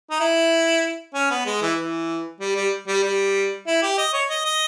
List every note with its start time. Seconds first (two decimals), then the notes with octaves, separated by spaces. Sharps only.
0.11 D#4
0.20 E4
1.15 C#4
1.31 B3
1.46 G#3
1.62 E3
1.78 E3
2.40 G3
2.56 G3
2.88 G3
3.03 G3
3.67 E4
3.83 G4
3.98 D#5
4.13 C#5
4.30 D#5
4.45 D#5